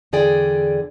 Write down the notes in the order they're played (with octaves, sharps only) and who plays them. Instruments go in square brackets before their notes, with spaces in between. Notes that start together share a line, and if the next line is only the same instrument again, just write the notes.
[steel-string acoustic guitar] E2 D3 G#4 D5 G5